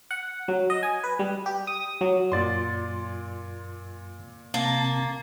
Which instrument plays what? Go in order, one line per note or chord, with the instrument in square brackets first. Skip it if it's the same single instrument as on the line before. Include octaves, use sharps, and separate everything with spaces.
[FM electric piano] F#5
F#3
D#5
G#5
B4
G3
G4
D#6
F#3
[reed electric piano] F#2 F4 A6 [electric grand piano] A#2 D5 C6
[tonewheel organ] C3 A5 [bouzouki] A#3